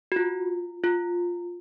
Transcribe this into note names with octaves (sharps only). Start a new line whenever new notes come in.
F#4
F4
F4